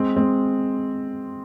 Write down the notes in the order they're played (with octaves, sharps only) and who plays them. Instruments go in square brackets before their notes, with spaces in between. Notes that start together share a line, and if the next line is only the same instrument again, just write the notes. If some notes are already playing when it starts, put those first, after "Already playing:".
Already playing: [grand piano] G#3 C4
G#3 C4